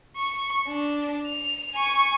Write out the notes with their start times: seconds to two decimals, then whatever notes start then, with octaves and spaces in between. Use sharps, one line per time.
0.17 C#6
0.67 D4
1.27 F7
1.74 G#5 C#6